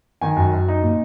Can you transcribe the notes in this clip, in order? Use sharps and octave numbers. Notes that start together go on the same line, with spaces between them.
D#3 G#5
F#2
F#2
D#4
A#2